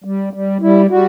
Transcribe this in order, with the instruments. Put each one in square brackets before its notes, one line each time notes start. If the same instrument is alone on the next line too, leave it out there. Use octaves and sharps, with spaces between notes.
[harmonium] G3
G3
G3 E4
G3 F#4